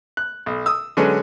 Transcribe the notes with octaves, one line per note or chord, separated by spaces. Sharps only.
F#6
B1
D#6 E6
D3 F#3 G#3 C#4 B4